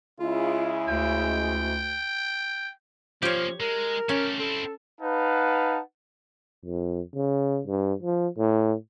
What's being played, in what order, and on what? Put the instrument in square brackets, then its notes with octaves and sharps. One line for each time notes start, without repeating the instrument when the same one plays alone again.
[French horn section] C#3 G#3 E4 [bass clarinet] F4
[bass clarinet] D2 [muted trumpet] G5
[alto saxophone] F3 [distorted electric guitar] A#3 C#4 [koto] G4 C#5
[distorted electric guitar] G#3 [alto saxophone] A#4
[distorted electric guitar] A3 G4 [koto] C#4
[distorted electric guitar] C4 E4 [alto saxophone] A4
[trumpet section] D#4 B4 F5 F#5 A5
[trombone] F2
C#3
G2
F3
A2